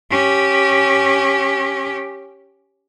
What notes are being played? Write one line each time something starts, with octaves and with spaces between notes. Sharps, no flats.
C#4 G4